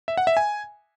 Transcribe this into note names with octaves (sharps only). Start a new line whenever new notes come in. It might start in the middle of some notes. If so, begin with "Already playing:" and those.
E5
F#5
E5
G#5